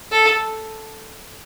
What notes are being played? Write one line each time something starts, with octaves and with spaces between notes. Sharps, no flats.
A4